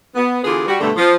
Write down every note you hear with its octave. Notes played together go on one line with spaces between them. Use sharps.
B3
D3 E3 B3 F4 G4 G#4
G3 F#4
G2 B2 D3 A3
F3